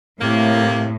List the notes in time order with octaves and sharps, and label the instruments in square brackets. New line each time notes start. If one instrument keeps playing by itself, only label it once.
[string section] A2 [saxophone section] C3 A#3